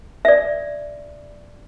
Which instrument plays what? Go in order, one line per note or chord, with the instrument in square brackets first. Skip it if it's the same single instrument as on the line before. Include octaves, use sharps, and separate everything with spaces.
[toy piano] D5 E5